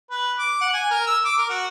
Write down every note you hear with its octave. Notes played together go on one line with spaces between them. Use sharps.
B4
D6
F#5
G#5
A#4
E6
D6
A#4
F#4